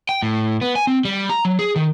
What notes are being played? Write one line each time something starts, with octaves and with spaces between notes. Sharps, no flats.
G5
A2
B3
G#5
C4
G3
A#5
F#3
G#4
D#3